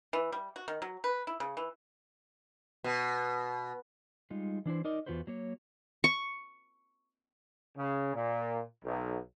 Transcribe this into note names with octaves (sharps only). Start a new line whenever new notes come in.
E3
G3
F#4
D#3
F#3
B4
E4
C#3
E3
B2
G3 G#3 D#4 F4
E3 D4 E4 C5
D#4 A#4 D5 D#5
E2 C3 F4 F#4 B4 C5
F#3 A#3 C#5
C#6
C#3
A#2
B1